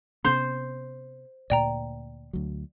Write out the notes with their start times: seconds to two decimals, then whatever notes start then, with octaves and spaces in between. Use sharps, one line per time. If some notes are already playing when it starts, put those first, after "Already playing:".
0.25 C3 B3 C#4 C5
1.50 D2 A#2 D5 G5 A#5
2.33 D2 F#3